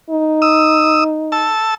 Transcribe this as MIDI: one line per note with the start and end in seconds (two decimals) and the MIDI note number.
0.10 1.51 63
0.42 1.04 87
0.42 1.04 88
1.32 1.74 81
1.32 1.74 88